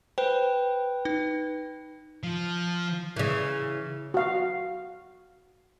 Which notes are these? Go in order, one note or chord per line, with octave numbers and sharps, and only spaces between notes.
B4 C5 G5
D#4
F3
C#3 E3
F#4 F5